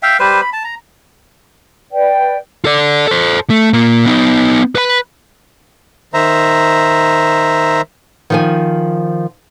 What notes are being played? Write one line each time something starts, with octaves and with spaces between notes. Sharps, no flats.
E5 F5 G5
G3 B4 C5
B5
A5
A#5
B4 D5 G5
A4 D5
A4 C5
A3
A#2 A#3
B3 D#4
B4 B5
D#3 C5 E5 A#5
D#3 F3 G#5